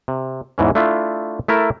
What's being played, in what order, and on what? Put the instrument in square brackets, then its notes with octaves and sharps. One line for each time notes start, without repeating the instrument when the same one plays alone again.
[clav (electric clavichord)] C3
E2 G#2 E3 C#4
A3 D4 E4 F4
A3 E4 A#4 A5